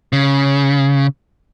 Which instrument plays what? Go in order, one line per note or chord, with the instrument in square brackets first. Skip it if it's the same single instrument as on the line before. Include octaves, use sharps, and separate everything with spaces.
[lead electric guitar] C#3